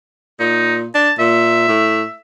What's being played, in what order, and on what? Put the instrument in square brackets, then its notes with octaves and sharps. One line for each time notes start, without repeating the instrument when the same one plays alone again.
[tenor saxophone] A#2 [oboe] D#4
[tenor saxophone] D4 [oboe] A5
[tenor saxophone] A#2 [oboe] E5
[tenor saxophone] A2